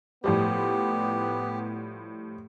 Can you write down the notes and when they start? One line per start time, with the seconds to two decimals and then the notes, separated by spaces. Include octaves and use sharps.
0.24 A2 F3 G3 B3 G4